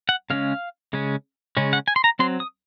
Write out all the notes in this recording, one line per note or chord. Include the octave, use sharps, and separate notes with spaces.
F#5
C#3 G#3 C#4 F5
C#3 G#3 C#4
C#3 G#3 C#4
F#5
G#5
C6
A#5
F#3 C4 C6
D#6